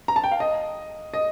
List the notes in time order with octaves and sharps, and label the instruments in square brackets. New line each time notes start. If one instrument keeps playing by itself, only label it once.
[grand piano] A#5
A5
G5
F5
D#5
D#5